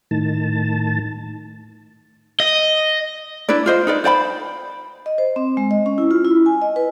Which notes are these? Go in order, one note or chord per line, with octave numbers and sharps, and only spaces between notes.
A2 D#3 A5
D#5
D4 E4 B4 D5
F4 C5 D#5
D#4 B4 D5
C5 D5 F#5 B5
D#5
C5
C4
G#3
D#5
C#4
E4
F4
E4
G#5
D#5
B4